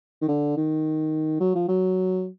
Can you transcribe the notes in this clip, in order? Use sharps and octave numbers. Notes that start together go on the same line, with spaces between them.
D#3
D3
D#3
F#3
F3
F#3